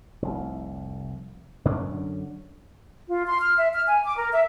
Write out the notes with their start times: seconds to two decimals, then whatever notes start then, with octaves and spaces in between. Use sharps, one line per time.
0.22 F1 C2
1.65 F#2 D3 C#4 D4
3.09 F4
3.26 C6
3.40 F6
3.57 E5
3.73 F6
3.88 G#5
4.05 D6
4.17 A#4
4.32 E5